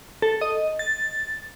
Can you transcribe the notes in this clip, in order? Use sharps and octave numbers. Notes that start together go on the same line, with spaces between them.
A4
D#5
A6